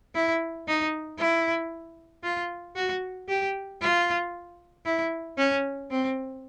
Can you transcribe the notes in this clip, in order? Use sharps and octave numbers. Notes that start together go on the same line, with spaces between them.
E4
D#4
E4
F4
F#4
G4
F4
E4
C#4
C4